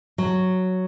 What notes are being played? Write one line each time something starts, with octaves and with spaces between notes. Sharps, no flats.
F#3